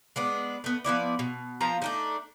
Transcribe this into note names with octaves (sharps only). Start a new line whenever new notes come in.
G#3 B3 D4
A3 B3
F3 B3 E4 D5
B2
F3 B3 F4 A#5
A3 D4 D#4